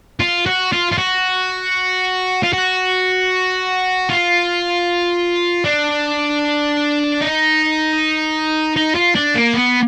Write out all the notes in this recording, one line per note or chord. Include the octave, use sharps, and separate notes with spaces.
F4
F#4
F4
F4
F#4
F4
F#4
F4
D4
D#4
D#4
F4
D4
A#3
B3